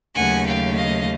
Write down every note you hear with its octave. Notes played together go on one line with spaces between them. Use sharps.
D#2 C#3 F#3 A3 F#5 G#5
F5 G5
D#5 F5